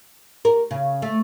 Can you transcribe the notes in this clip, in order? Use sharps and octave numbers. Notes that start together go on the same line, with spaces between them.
A#4
C#3
A3